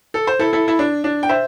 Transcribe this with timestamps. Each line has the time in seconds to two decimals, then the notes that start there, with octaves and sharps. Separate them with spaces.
0.14 A4
0.27 C5
0.39 E4 A4
0.53 E4 A4
0.68 E4
0.79 D4
1.04 D4
1.23 G5
1.29 C5 E5